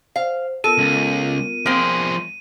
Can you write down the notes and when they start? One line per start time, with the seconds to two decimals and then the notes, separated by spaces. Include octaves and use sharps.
0.16 C5 F5
0.64 B3 F4 A4 A#4 D#7
0.78 C#2
1.66 F3 A#3 C4 G#4